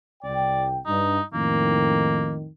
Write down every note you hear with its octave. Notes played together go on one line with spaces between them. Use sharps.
C2 D5 G5
G2 D#4
F2 A2 D#3 A#3